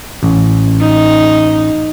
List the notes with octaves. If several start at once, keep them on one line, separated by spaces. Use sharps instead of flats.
A1
D#4